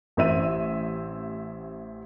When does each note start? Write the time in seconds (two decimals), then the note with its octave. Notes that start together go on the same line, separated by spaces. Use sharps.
0.17 A1 C4 E5 D#7